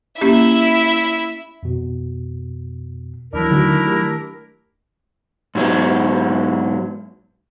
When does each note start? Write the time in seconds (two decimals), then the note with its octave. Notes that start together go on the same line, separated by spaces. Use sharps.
0.21 A#3 C#4 E4 G4 E5
1.63 F2 B2
3.33 D#2 E3 F#3 D4 E4 A#4
3.51 D3 D#3 F#3 A3
3.85 A3 G4
5.55 G#2 F#3 B3